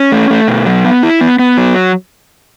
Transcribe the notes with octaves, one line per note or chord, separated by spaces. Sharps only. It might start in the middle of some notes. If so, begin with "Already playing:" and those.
Already playing: C#4
A3
A3
B2
F#3
B3
E4
B3
B3
F#3